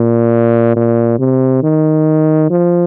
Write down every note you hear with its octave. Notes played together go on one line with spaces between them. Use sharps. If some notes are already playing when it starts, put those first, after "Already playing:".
Already playing: A#2
A#2
C3
D#3
F3